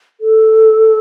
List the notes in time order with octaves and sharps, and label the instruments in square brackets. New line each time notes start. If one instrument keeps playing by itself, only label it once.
[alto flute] A4